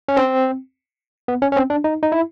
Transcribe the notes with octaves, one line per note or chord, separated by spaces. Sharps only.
C#4
C4
B3
C#4
C#4
C4
D4
D#4
D#4
E4